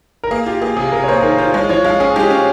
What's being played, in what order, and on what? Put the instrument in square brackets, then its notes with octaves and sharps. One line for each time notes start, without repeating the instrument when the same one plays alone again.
[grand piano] A#4
[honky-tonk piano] A#3 [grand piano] G#4
[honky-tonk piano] F4 [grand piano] G4
[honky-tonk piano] A#3 [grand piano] G#4
[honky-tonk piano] C3 [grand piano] G#4
[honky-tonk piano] C3 [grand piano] A#4
[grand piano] C#5
[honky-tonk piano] A#3 [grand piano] C5
[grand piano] G#4
[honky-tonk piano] D#3 [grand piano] A#4
[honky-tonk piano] F4 [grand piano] C5
[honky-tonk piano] G#3 [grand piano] C#5
[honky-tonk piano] F3 [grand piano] C#5
[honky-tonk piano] G#3 [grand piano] F5
[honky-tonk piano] C#4 [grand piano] G#4
[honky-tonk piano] G#3 [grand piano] G4
[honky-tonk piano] C#4